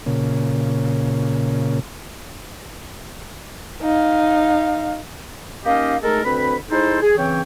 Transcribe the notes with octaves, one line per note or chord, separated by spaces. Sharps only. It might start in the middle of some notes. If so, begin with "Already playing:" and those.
A#2 C#3
D#4 F5
A#3 C#4 D#4 G4 D#5 F5
G#3 A3 D#4 A4 A#4
D2 C4 B4 B5
G#3 D#4 E4 A4 C5
G#4
C#3 E3 C4 C#5 G5